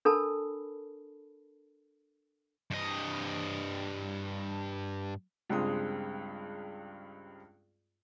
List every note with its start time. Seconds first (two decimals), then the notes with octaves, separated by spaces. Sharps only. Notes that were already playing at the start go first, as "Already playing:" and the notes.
0.05 D4 A4 A#4 A5 B5
2.71 G2 D#5
5.50 C#2 G2 G#3 C4 D#6